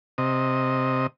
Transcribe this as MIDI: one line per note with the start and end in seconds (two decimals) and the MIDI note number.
0.18 1.07 48
0.18 1.07 75